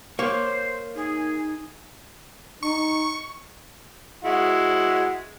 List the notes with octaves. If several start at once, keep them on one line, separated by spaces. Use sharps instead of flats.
A#3 C5 C#5
D#4 G#4
D#4 C#6
G#3 E4 F#4